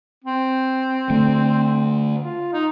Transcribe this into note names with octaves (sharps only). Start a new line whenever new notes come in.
C4
D3 A3
F4
D#4